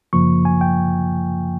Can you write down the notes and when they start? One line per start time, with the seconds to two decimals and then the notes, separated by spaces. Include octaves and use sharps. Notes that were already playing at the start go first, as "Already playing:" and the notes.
0.13 F#2 C#3 F3 A#3 C#6
0.45 G#5
0.61 G5